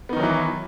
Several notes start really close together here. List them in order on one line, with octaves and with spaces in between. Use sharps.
B3 D#4 D#3 F#3 E3